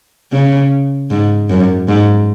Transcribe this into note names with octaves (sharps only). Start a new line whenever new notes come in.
C#3
G#2
F#2
G#2